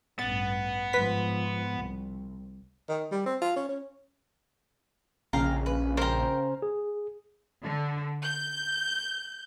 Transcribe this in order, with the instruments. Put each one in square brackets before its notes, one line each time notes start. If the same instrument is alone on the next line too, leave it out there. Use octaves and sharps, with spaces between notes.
[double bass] A1 G2 [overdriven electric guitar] B3 [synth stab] A6
[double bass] G#2 F3 [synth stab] B4 B6
[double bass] C2
[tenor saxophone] D#3
G3
C4
F4
C#4
C#4
[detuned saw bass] A#1 [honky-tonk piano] C#3 [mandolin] F5 G5 A#5
[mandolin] B4
[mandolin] A#4 G5 [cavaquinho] C5 A#5
[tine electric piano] G#4
[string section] D3
G6